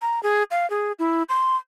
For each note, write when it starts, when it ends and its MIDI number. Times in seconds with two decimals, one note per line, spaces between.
0.02 0.22 82
0.23 0.43 68
0.51 0.68 77
0.70 0.92 68
0.99 1.23 64
1.29 1.56 84